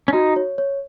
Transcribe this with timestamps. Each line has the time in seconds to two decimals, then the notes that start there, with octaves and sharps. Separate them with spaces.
0.08 C#4
0.13 D#4 F#4
0.36 C#5
0.58 C#5